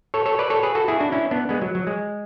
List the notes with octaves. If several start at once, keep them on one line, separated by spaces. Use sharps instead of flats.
A4 C#5
A4 C#5
B4 D5
A4 C#5
G#4 B4
F#4 A4
E4 G#4
D4 F#4
C#4 E4
B3 D4
G#3 B3
F#3
F#3
G#3